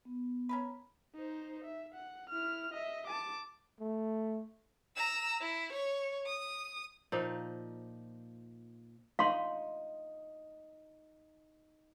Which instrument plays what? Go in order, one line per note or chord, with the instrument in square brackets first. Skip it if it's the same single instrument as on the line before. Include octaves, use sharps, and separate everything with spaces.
[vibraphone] B3
[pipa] C#4 A#4 B4
[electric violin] D#4 C5
E5
F#5
E4 F6
D#5 E5
A5 D6
[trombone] A3
[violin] A#5 E6
E4
C#5
D#6
[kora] A#2 F3 D#4
[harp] D#4 [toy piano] F5 C6